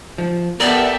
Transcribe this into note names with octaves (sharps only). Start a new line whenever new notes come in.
F3
B3 G4 A4 A#4 D5 E5